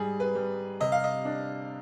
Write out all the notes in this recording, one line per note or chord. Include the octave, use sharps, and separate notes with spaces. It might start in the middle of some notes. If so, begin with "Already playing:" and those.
Already playing: G#2 G3 G#4
B4
G3
C3 D#5
F5
D#5
D4